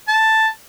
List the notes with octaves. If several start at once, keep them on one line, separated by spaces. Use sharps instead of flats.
A5